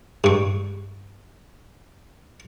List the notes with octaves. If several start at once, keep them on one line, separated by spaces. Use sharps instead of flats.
G2 C#6